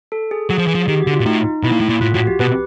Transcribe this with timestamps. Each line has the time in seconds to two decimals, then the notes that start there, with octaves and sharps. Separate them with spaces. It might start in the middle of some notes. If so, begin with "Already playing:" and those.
0.12 A4
0.31 G#4
0.49 F#3 G#4
0.58 F3
0.67 E3 G#4
0.75 F3
0.88 D#3 G4
1.00 F#4
1.07 D3
1.13 F4
1.20 A#2
1.26 A2 D#4
1.44 D#4
1.63 B2 E4
1.72 A#2
1.81 A2
1.89 A#2
2.01 A2 F4
2.14 A2 F#4
2.27 G4
2.40 B2 B4